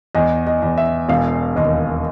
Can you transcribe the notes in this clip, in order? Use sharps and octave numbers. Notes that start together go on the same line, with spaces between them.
E2 D#5
D#5
E2
E5
E1 F5
D#2 D#5